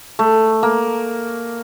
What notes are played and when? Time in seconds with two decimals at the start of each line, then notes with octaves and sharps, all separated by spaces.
0.19 A3
0.63 A#3